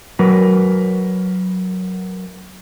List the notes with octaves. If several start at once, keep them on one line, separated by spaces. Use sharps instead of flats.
F#3 A#4 B4